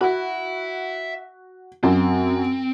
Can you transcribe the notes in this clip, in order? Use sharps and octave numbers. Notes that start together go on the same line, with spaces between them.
F#4 E5 B5
F#2 C4